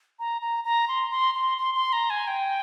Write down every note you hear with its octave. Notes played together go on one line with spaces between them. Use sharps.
A#5
A#5
A#5
C6
C6
C6
C6
C6
A#5
G#5
G5